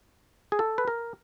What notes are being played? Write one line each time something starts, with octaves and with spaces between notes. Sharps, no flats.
G#4
A4
B4
A#4